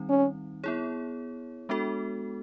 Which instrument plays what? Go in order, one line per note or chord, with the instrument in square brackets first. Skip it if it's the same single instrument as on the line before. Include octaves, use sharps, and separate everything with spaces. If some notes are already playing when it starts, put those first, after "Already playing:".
Already playing: [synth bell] D#3 G3 C4 D#4
[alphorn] C#4
[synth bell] B3 E4 G#4 C#5
G#3 B3 D4 F#4 A4